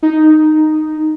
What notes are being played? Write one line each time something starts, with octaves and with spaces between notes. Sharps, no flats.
D#4